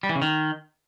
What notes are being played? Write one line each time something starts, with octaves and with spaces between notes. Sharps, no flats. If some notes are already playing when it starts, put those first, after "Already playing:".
G3
E3
C#3
D#3